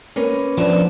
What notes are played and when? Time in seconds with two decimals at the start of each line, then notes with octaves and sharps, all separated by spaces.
0.16 A#3 C#4 B4
0.58 F3 B3 D4